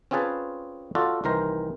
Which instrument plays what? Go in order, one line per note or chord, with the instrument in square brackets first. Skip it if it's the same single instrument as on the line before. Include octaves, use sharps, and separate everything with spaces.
[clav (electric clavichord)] C4 C#4 F4 G#4 B4 A5
F4 F#4 A4 D5
C2 D#3 E3 A#4 C5